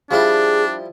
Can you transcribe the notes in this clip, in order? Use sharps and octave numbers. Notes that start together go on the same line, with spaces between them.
F3 G3 D4 E4 G#4